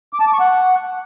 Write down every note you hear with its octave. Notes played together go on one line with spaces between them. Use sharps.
D6
A5
D6
C#6
F#5